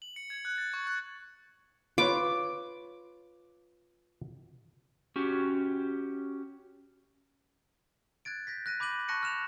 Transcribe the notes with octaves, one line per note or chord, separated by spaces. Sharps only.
F#7
C#7
G#6
F#6
A6
C#6
F#6
F4 B4 C#5 D6
C#4 F#4 G4
F#6 G#6 A6 D7
G6 A#6 B6
F#6 A#6 D#7
B5 D6 G6 D#7 F#7
A5 C#6 F#6 A#6 C#7 D#7
F6 F#6 E7 F7